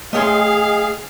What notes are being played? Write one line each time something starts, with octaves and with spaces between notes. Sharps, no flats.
A3 G#4 C#5 D#5 F5 G5 C6